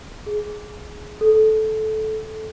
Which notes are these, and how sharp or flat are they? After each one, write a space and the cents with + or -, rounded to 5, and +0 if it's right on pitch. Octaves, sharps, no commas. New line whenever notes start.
G#4 +10
A4 -15